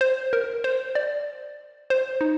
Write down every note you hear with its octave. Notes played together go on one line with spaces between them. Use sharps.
C5
A#4
C5
D5
C5
D#4